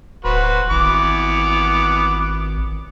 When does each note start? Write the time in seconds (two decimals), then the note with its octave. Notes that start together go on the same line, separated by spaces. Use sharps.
0.25 D1 F#4 B4 C5
0.71 G#1 E3 B3 D6